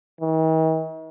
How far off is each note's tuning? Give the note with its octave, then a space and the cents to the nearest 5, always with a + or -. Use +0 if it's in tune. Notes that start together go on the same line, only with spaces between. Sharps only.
D#3 +45